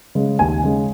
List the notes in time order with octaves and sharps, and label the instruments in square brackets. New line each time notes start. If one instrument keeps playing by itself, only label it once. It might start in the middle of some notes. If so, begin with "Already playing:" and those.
[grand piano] C#3 G#3
D#2 G#5
C#3 G#3